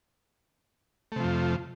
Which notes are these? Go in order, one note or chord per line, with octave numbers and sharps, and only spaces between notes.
F2 C3 F3 A3